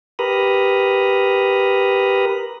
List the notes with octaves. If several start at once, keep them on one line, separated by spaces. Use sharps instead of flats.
G4 A#4 B4 A#5 B5 D#6